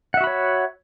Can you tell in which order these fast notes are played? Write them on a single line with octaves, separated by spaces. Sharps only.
F#5 E5 F#4 B5 C#5